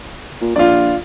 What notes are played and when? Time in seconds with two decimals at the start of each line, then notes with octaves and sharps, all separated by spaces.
0.41 A#2
0.56 A#1 F4 D5